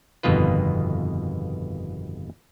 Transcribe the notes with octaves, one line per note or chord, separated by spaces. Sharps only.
G1 F2 B2 D#3 F4 B4